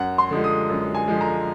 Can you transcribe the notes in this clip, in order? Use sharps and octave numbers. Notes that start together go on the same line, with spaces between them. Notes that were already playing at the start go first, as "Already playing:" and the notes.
Already playing: F#2 F#5
C6
D3 F3 G#3
D#6
F#2
G#5
D3 F3 G#3
A#5